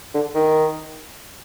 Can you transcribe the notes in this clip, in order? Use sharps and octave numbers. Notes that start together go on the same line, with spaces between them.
D3
D#3